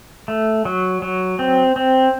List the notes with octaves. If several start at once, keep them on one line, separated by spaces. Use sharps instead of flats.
A3
F#3
F#3
C4
C4